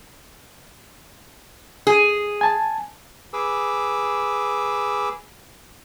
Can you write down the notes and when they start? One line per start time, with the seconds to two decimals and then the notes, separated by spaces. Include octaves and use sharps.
1.87 G#4
2.41 G#5 A5
3.33 G#4 B4 D6 E6